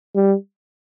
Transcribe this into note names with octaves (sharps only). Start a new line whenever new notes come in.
G3